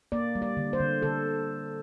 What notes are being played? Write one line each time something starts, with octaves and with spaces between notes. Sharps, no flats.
A#3 D5
G3
D5
D3
C5
D3
D3 A4